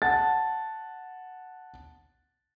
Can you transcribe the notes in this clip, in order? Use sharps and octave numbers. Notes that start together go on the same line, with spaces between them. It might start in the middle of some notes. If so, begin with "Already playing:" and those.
F#5 A5 A6